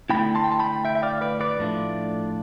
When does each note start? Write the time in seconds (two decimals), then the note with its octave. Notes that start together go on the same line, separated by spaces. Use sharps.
0.10 D3 A3 C4 E4 G5 B5
0.35 A5 C6
0.44 G5
0.52 A5
0.59 G5 B5
0.85 E5 G5
0.95 E5
1.03 D5 F5
1.21 B4 D5
1.41 B4 D5
1.59 A2 F3 A3 D4 F4